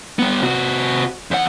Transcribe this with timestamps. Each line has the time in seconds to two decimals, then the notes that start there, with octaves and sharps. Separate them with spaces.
0.19 G3 B3
0.42 C3 F#4
1.31 E2 F#5